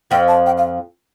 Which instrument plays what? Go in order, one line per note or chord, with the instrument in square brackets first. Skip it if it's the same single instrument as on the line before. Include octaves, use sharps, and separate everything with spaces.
[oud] F2 F3 [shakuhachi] G5
[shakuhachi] A5
G5
F5